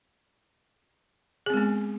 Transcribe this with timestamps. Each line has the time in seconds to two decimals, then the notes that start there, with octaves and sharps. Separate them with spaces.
1.46 G#4
1.50 C4
1.54 G#3
1.57 B3